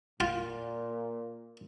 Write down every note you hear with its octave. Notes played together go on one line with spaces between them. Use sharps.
A#2 F4